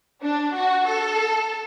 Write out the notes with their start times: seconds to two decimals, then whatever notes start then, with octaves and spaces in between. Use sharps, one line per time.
0.22 D4
0.54 F#4
0.87 A4